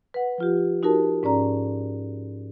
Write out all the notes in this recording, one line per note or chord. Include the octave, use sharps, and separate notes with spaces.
B4 F#5
F3 F4 G4
D#4 F#4 G4 A#4 A5
G#2 C#4 D5 A#5